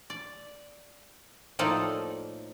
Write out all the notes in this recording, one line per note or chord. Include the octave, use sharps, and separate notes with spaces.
D5
A2 F3 A#3 D#4 A4 D5